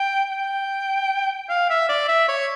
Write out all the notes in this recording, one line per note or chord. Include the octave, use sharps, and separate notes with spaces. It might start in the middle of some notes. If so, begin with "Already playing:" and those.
Already playing: G5
G5
F5
E5
D5
E5
C#5